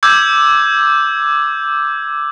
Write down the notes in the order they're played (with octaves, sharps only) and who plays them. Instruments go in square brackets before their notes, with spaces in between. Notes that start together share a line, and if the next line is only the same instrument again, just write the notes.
[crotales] D6 E6 G6 G#6